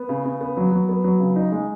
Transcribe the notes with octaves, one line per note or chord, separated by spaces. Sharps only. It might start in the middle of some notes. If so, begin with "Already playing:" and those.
Already playing: B3
C#3
C#3
B3
F#3
F#3
B3
F#3
C#3
D#4
G#3